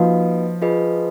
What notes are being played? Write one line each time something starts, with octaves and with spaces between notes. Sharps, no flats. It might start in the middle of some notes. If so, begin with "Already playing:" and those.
Already playing: F3 A#3 D#4 F#4 B4 D#5
F4 G#4 B4 D#5